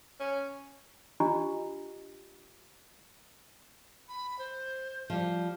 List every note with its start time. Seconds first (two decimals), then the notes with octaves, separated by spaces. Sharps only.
0.20 C#4
1.20 D4 F4 G4 D#5 A#5
4.09 B5
4.39 C5
5.10 F3 G3